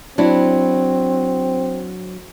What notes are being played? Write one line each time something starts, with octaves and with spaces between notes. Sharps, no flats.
F#3 C4 D4 E4